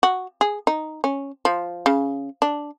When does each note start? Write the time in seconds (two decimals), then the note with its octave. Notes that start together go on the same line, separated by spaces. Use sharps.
0.03 F#4
0.41 G#4
0.67 D#4
1.04 C#4
1.45 F3
1.86 C#3
2.42 D4